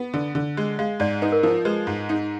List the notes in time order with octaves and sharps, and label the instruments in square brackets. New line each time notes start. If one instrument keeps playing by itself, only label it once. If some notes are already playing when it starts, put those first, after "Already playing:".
Already playing: [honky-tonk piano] B3
D3
D3
G#3
[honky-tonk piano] G#3 [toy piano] F5
[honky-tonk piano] G#2 [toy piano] D5
[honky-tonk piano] D#4 [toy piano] B4
[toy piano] A#4
[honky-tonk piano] F3 [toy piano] A#4
[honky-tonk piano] G#3 [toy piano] B4
[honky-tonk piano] G#2
D#4